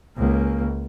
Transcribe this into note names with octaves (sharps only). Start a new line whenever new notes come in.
C#2 A#3